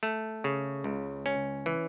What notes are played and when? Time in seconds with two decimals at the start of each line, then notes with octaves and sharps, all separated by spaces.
0.03 A3
0.44 C#3
0.84 C#2
1.26 C#4
1.66 E3